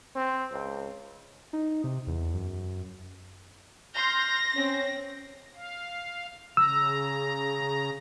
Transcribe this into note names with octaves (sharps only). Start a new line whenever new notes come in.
C4
C#2
D#4
C3
E2
F#2
C6 F6 G6 A#6
C4 C#4
F5
C#3 A#5 E6